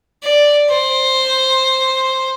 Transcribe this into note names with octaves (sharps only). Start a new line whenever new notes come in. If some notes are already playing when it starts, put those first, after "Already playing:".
D5
C5